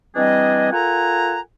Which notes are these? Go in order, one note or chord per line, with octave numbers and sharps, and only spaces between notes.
E3 G3 C4 D4 G#4 D#5
F4 A4 A#4 F#5 G#5 A#5